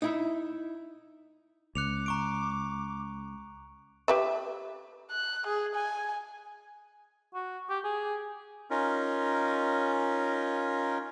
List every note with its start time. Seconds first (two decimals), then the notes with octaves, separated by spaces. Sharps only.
0.02 D#4 E4 E5
1.75 C#2 D6 F#6 C#7 F7
2.06 A#5 C#6 D7
4.08 G4 B4 E5
5.12 F#6
5.47 G#4
5.76 G#5
7.34 F#4
7.70 G4
7.84 G#4
8.71 C#4 D#4 F4 A#4